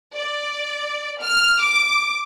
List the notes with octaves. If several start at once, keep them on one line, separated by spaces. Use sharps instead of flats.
D5
F6
D6